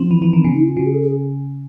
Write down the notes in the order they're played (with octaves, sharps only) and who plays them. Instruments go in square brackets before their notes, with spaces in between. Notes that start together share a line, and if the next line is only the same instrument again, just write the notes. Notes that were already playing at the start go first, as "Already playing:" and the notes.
Already playing: [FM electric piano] F3 [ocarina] C4
[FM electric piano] E3
E3
D#3
[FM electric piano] C#3 [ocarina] B3
[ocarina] D#4
E4
F4
[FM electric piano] C#3 [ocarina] F#4
[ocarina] G#4
A4
G#4